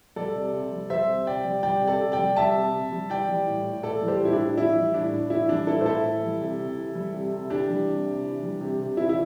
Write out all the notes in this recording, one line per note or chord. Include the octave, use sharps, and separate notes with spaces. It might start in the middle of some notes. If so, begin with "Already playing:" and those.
G3 A4 D5
C3
C3
G3
G3 C5 E5
C3
C3 D5 G5
G3
G3 D5 G5
C3
A4 D5
C3
D5 G5
G3
G3 E5 A5
C3
C3
G3
E3 D5 G5
G3
A2
A2
E3 A4 D5
G3
G4 C5
A2 E4
D4 G4
A2
E3 E4
G3
A2 D4
A2
E3 E4
G3 D4
A2 E4 A4
C5
A2 E4 A4
E3
G3
C3
C3
E3
G3
C3
C3
E3 D4 G4
G3
C3
C3
E3
G3
C3
C3
E3 E4
E4